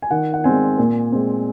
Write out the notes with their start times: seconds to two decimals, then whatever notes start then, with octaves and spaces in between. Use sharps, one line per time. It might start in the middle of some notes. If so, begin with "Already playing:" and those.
0.02 G#5
0.11 D#3 F#5
0.34 F#5
0.44 G#3 C4 G#5
0.78 A#2
1.12 G#3 C4